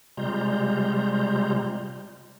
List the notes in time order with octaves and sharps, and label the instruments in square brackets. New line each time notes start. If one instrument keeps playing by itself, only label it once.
[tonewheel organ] C3 G3 G#3 F4 A#5 G6